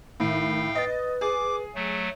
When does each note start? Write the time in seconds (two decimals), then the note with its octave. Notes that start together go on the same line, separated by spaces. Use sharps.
0.20 A2 D#3 F5 G5
0.75 B4 D#5 A6
1.21 G#4 D6
1.75 F#3 A3